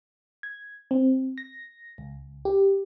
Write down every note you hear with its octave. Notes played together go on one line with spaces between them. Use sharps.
G#6
C4
A#6
C#2
G4